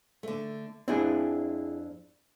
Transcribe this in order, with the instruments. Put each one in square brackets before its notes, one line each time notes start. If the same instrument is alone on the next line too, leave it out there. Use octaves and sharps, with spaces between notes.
[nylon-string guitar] D3 A3
[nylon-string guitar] F2 D4 [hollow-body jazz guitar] C4 E4 G#4